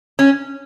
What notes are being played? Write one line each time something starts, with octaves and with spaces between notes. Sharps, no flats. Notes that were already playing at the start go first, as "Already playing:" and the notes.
C#4